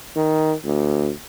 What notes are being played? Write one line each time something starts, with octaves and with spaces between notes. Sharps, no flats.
D#3
D2